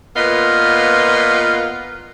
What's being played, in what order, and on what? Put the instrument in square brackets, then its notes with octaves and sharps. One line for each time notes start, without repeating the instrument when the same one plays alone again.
[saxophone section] A#2 B3 F4 B4 D#5